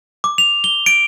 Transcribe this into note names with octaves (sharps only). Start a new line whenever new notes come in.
D6
F7
G7
D7